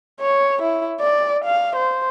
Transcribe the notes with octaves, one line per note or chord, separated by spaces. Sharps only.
C#5
E4
D5
F5
C5